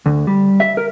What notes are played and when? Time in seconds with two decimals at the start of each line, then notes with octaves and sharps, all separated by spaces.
0.06 D2
0.27 G3
0.60 E5
0.77 A#4